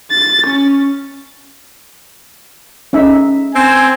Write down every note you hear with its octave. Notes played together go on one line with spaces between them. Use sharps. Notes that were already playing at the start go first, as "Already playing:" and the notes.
A6
C#4
C#4 D#4 E5
C4 G#5